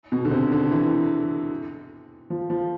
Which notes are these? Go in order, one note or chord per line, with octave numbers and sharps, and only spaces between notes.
B2
D3
C3
D3
E3
F3
F3